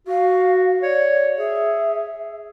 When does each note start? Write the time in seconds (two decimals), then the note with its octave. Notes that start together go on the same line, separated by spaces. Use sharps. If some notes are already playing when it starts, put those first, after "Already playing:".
0.07 F#4 F5
0.82 C#5 D5
1.38 G#4 E5